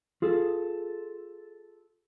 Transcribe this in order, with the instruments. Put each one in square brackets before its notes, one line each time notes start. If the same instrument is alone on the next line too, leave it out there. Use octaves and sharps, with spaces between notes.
[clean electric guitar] F4 G#4 A4